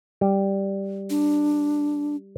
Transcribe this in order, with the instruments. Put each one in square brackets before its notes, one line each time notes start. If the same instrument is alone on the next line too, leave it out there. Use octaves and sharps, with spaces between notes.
[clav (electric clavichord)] G3
[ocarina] D4